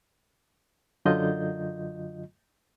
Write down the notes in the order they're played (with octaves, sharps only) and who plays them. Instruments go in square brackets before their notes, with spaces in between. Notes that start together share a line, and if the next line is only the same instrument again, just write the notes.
[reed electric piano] F#2 D3 F#3 F4 D#5 G6